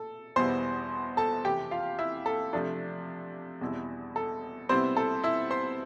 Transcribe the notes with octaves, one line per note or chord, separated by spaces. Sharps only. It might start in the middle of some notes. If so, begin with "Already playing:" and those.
Already playing: A4
E2 B2 G3 B3 E4 C5 C6
A4 A5
F2 C3 E3 A3 G4 G5
F4 F5
E4 E5
A4
C3 F3 A3 D4
E2 B2 G3 C4 E4
A4
C3 G3 B3 C4 E4 C5
A4
E4 E5
C5 C6